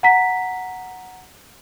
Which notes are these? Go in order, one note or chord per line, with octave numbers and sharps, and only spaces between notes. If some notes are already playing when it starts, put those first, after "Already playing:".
F#5 A#5 B6